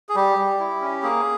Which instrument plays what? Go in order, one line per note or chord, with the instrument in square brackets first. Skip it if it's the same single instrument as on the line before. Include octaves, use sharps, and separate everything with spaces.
[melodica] G#4
G3 G4
G3
E4
C#4
A#3 G#4